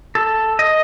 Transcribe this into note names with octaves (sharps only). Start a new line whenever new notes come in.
A4
D#5